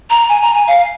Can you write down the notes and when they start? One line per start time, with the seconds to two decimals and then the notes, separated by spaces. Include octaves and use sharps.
0.10 A#5
0.29 G#5
0.42 A#5
0.55 G#5
0.68 F5